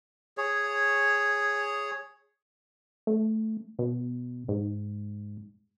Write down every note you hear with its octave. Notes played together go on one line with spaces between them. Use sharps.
G#4 C#5
A3
B2
G#2